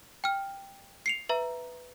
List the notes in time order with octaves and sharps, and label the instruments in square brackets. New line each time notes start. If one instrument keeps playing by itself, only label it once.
[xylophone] G5 F6
C7 C#7 F7
B4 E5 A#5